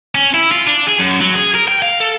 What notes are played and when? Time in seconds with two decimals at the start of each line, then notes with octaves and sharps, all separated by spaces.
0.15 C#4
0.34 E4
0.51 F4
0.67 D4
0.87 G#4
1.00 F#2
1.21 F#3
1.35 G#4
1.55 A#4
1.68 G5
1.82 F5
2.01 A4